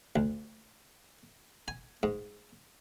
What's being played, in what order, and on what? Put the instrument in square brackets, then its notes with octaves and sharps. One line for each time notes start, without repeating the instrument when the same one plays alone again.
[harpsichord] D2
G#5
G#2